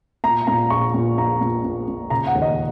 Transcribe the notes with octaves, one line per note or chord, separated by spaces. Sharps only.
A#2 A#5
A#2 A#5
A#1 C#6
A#2
A#1 A#5
A#2
A#1
A#2
C#3 A#5
F#5
D#2
D#5